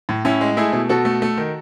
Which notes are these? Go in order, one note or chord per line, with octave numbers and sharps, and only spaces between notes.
A2
A2 C#4 E4
G#3
A3 E4 G#4
B2
B2 F#4 A4
A3
A3
D#3